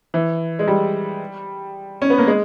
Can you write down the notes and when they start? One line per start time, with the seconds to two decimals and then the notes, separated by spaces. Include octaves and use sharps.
0.14 E3
0.59 G#3
0.68 G3
2.02 C#4
2.10 B3
2.18 A#3
2.27 G#3